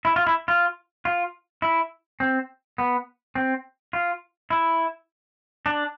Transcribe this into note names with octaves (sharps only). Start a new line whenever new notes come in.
E4
F4
E4
F4
F4
E4
C4
B3
C4
F4
E4
D4